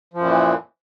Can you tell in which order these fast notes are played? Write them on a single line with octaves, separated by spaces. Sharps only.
F3 F#2 A#2 E3